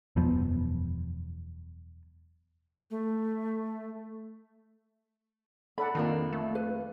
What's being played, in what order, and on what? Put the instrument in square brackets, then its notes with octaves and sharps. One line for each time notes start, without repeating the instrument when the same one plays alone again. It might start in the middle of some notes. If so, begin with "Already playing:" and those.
[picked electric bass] E1 F#2 F3 B3
[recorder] A3
[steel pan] A4 D5 F#5 [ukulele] B5
[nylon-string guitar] F2 A#3 D4 [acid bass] D#3
[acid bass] A3
[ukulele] B4